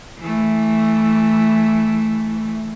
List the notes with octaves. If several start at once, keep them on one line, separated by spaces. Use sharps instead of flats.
E3 A3